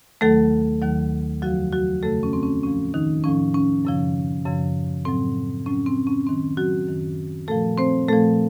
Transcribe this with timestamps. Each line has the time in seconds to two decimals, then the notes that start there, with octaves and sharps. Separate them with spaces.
0.21 D#2 D#3 F#3 A3 A4
0.82 D#2 D#3 F#3
1.42 F2 C#3 F3 F#3 F#4
1.72 F#3 F#4
2.03 F2 C#3 F3 A3 A4
2.23 C#4
2.33 C4
2.43 C#4
2.63 A2 F3 C#4
2.94 D#3 D#4
3.24 A2 F3 C#4
3.54 C#4
3.85 F#2 C#3 F3
4.45 F#2 C#3 F3
5.05 A2 F#3 C4
5.66 A2 F#3 C#4
5.86 C4
6.07 C#4
6.27 F#2 D#3 F#3 C4
6.57 F#3 F#4
6.87 F#2 D#3 F#3
7.48 A#2 F3 A3 A4
7.78 C4 C5
8.08 A#2 A3 A4
8.13 F3